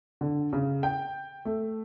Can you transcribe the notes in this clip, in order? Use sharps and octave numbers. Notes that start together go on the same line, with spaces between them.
D3
C#3
G5
A3